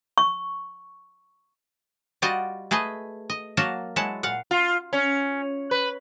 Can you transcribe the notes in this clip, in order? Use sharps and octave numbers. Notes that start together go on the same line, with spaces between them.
C#6
G3 F4 F#4 D5 D#5
A3 G#4 B4 D#5
D#5
F#3 A#3 F#4 A#4 A5 A#5
F#3 G#3 E4 F#5 A5
A#2 F5 F#5
F4
C#4
B4